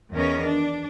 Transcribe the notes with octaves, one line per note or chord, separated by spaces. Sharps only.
E2 D#3 B3 C#4 A#4 D#5
D4